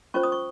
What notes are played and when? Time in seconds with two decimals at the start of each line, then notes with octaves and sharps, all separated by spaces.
0.14 C#4 F4 C5 C#6
0.23 D#6
0.32 C#6